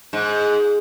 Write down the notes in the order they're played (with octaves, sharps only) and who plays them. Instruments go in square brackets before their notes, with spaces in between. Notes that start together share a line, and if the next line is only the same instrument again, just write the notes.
[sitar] G#2